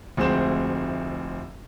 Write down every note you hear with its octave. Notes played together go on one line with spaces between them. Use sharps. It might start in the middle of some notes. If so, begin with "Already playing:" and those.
F1 D2 G#3 C4 C5 E7